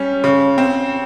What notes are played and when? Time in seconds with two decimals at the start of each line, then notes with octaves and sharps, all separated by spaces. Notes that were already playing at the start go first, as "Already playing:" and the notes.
Already playing: G3 C#4
0.24 C#3
0.58 C4